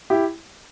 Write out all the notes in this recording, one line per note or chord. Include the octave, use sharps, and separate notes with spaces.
E4 G4